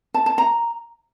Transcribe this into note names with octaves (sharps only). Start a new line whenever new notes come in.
A5
A5
A#5